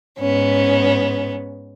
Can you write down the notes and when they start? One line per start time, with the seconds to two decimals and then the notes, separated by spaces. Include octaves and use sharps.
0.19 G#2 B3 C#4